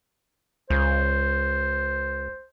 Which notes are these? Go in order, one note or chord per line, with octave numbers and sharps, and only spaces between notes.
C#2 C5